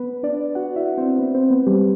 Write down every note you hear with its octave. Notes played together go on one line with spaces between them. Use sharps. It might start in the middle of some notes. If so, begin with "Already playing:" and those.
Already playing: B3 B4
D4 D5
F#4 F#5
E4 E5
C4 C5
B3 B4
C4 C5
B3 B4
G3 G4